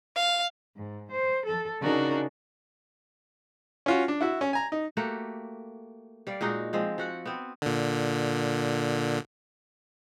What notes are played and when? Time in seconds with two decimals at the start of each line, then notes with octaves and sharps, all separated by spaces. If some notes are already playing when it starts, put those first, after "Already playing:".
0.16 F5
0.77 G#2
1.11 C5
1.45 A4
1.82 C#3 D4 D#4 F#4 A#4
3.86 C#4 F4 F#4
4.08 D4
4.21 E4 F#4 E5
4.41 C#4
4.53 G#5 A#5
4.72 D#4
4.97 A3 A#3 F#4 G4
6.27 G3 D5 F5
6.41 A#2 G#3 D#4 F#4
6.73 F3 G#3 C4
6.98 F3 F#4 F#5
7.26 B3 C4
7.62 A#2 D3